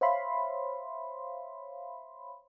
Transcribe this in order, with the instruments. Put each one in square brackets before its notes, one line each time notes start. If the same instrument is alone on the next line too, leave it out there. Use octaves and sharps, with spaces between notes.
[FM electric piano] C5 C#5 E5 F5 B5 C6